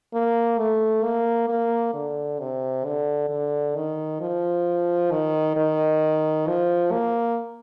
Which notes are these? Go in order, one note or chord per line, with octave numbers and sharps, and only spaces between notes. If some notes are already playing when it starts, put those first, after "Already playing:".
A#3
A3
A#3
A#3
D3
C3
D3
D3
D#3
F3
D#3
D#3
F3
A#3